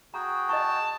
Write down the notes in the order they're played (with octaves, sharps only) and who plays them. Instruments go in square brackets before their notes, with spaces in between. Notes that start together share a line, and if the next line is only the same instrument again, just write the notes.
[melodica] F#4 G#4 G5 [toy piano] A#5
[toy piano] D#5 C#6 [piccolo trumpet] A5